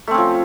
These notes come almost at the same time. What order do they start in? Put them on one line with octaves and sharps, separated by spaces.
A3 C4 C#4 F3